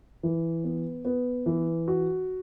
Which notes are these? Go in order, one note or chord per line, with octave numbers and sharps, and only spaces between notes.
E3
B3
B3
E3
F#4